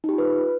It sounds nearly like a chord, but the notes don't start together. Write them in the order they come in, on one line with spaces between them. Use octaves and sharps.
D#4 G4 F4 B4